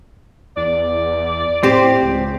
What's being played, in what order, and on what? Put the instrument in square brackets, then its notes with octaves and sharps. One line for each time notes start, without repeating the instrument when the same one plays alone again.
[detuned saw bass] E2 [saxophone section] D5
[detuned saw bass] A2 [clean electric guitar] C4 [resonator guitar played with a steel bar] G4 C5
[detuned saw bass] C#2